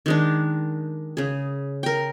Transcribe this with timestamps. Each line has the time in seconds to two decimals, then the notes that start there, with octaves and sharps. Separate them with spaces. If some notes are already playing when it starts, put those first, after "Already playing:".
0.06 D#3 G#3 D4
1.17 C#3 G#4
1.83 A#4 G5